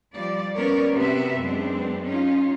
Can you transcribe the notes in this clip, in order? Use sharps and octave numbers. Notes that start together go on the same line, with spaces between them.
F3 G3 D5
B3 C#4 A#4 C#5 D5
C3 B3 C4 F#4 E5
F#2 G#3 B3 C4 D4
C#4 D#4 F4